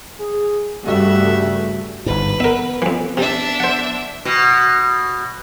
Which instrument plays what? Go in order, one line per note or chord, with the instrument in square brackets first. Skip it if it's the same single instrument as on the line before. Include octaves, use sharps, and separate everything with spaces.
[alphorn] G#4
[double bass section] G2 C#3 A3 [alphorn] G3 [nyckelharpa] F#4 E5
[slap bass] G1 G#2 [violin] B4
[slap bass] B3 [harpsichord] A#4 E5
[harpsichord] F2 E3
[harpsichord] C3 [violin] D4 E5
[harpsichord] C5 F#5
[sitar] B2